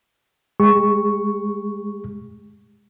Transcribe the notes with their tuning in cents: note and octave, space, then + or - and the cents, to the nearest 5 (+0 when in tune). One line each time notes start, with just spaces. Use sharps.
G#3 +0 G4 +40 C#6 +0